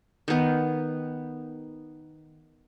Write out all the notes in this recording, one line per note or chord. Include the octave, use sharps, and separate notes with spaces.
D#3 B3